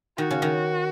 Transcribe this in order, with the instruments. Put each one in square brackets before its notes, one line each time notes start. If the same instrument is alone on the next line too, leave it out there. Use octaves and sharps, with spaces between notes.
[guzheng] D#3 [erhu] F#4
[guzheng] C#3
D#3